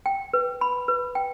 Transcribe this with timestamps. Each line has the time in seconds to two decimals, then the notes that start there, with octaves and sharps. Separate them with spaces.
0.06 G5
0.33 B4
0.61 B5
0.88 B4
1.15 G5